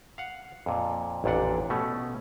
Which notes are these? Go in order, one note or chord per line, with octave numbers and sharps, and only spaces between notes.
F5 F#5
F2 A#2
A1 F2 A#2 D4 F#5
B2 A3 C#4